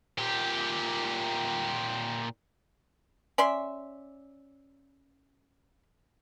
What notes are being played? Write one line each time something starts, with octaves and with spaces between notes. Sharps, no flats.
A#2 G4
C#4 D5 E5 C6